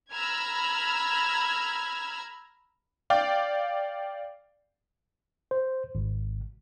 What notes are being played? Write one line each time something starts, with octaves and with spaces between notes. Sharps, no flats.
A#5 B5 E6 F6 G#6
D5 F5 G5
C5
G#1